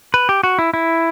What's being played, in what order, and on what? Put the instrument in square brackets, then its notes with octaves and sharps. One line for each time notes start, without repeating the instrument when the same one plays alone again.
[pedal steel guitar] B4
G4
F#4
E4
E4